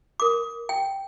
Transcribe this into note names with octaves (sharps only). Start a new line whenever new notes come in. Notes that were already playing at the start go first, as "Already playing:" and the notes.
A#4 D6
G5